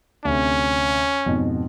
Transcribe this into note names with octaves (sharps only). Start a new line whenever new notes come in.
D2 C3 C#4
F2 G#2 B2